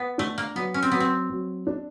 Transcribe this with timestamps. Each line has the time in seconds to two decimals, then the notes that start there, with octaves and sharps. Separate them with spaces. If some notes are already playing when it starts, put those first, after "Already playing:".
Already playing: B3
0.18 A3 D4
0.38 A#3
0.56 F#3 B3
0.74 C#4
0.82 C4
0.92 F#3 B3
1.00 C4
1.30 F#3
1.67 D4